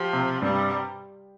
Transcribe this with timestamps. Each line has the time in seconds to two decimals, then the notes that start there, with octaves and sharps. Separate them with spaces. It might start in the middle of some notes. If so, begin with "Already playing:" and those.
Already playing: F3 G4
0.13 C3
0.42 G2 G3